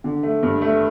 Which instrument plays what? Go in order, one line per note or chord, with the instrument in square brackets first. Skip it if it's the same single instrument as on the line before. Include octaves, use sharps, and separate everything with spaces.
[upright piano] D3
A3
G2
A3